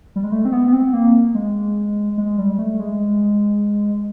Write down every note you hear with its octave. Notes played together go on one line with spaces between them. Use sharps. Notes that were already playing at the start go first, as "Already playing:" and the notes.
G3
G#3
A3
C4
B3
B3
C4
A#3
G#3
G#3
G3
A3
G#3